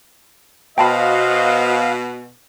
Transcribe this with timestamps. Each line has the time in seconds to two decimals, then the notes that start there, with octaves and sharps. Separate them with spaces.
0.78 B2 F#4 C5 D#5 F5 G5 A5 B5